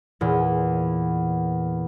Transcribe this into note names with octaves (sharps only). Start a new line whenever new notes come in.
E2 A#2